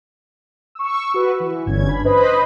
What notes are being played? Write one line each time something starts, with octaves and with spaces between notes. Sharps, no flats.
C#6 E6
F#4 B4
E3
G1 C#4 G#6
D4 B5
B4 C5 D#5 B5